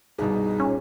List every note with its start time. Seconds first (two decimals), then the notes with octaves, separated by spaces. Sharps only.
0.18 C2 G2 B2 D#4 G#4
0.60 A#2 C#4